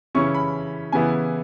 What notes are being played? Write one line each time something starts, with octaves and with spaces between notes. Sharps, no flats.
C#3 E3 C#4 E4 C#6
B5
C#3 E3 B3 E4 G#5